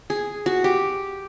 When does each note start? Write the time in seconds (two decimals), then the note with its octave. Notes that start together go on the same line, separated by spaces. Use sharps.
0.10 G#4
0.46 F#4
0.64 G4